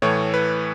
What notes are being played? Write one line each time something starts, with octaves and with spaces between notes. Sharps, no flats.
A2 E3 A3 C#5
B4